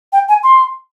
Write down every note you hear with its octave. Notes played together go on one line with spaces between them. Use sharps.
G5
G#5
C6